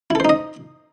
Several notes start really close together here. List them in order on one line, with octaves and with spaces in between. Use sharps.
E4 A4 C5 D#4 D#5